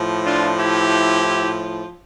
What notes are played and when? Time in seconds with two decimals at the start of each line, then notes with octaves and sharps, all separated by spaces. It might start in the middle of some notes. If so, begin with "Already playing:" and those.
Already playing: A2 F3
0.25 D4 F4
0.58 E4 G4